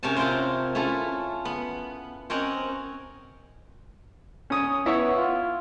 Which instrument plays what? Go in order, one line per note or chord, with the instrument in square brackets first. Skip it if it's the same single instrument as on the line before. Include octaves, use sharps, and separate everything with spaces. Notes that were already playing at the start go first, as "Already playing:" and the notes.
[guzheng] C3 C#4 A#4 C#5 G#5 A5
C4 E4 F4 A#4 C5
C#4 E4 F4 A4
B3
C4 C#4 A#4 C#5 D#5 F#5
[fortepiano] C#4 D#6
[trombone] B3 [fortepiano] E4 C#5
[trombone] F4